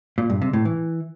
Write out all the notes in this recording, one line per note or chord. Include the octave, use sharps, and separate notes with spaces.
A#2
G2
C3
A2
E3